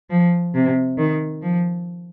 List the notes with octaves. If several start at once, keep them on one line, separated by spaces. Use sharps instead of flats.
F3
C3
D#3
F3